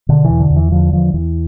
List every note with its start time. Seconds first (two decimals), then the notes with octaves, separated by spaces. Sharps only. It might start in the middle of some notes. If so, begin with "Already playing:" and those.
0.09 B2 D3
0.24 E3
0.30 E2
0.40 D3
0.50 E2
0.56 E3
0.72 D3 F3
0.93 E2 F3
1.14 E2 E3